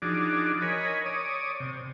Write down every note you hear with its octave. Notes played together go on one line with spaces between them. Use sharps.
F3 D4 D#4 F#4 G#4 D5
A#4 C#5 D#5 G#5 B5
C#5 D5 D#6
C3